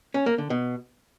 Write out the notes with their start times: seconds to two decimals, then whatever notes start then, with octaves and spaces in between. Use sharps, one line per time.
0.14 C#4
0.26 A#3
0.38 D3
0.50 B2